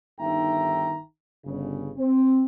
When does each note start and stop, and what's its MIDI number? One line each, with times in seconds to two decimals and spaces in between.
0.19 0.97 31
0.19 0.97 51
0.19 0.97 63
0.19 0.97 76
0.19 0.97 79
0.19 0.97 82
1.45 1.90 31
1.45 1.90 49
1.97 2.44 60